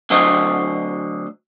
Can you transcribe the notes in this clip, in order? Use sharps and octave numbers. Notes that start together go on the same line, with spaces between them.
D2 D3 F#3 C5 D#5